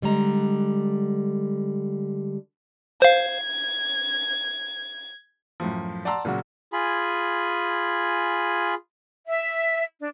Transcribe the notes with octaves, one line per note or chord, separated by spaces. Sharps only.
D3 G3 G#3 A#5
C5 F5 G#6
F#2 A2 F3
D5 F#5 A5 A#5 C6 E6
A#2 C#3 F#3 F#4
F4 G#4 G#5 B5
E5
D4